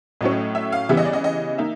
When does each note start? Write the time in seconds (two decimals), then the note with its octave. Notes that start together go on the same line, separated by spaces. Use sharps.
0.21 A2 F#3 A3 C#4 D#5
0.55 E5
0.72 F5
0.89 C#3 E3 G3 B3 E5
0.97 D#5
1.05 D5
1.13 D#5
1.24 D#5
1.58 A#3 D#4 E5